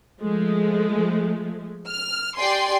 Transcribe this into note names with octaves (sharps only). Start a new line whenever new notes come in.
F3 G#3 A3
F6
G4 D5 G5 G#5 C6